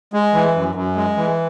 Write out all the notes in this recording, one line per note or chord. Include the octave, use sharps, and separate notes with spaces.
G#3
E3
F#2
F#2
G#3
E3